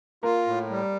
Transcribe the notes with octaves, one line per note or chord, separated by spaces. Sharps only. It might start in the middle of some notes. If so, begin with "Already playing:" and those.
A#3 F4 A#4
A2
G3